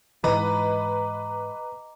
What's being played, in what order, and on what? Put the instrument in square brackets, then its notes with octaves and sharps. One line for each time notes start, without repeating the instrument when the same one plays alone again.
[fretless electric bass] G#2 E3 [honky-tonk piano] B4 [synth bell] D#5 A#5 D6